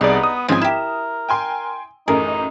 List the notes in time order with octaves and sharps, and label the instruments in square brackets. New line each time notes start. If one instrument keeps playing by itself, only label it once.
[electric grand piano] C2 G#4 D5 [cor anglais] B3 [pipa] D#4
[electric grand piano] D#6
[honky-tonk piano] G#2 F3 C4 [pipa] C#3 G#5 [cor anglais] C5
[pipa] E4 G4 [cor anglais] A#4 [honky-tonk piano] E7
[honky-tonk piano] G5 G#5 C6
[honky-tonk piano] A1 F#2 A2 [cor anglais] D#4 [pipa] G#4 A#4